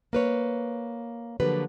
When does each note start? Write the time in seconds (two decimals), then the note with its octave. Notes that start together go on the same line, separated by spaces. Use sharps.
0.13 A#3 B4 C#5
1.40 D3 F3 F#3 A#3 G4 B4